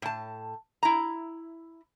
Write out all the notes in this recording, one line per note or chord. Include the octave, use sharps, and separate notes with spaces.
A2 A5
E4 A#5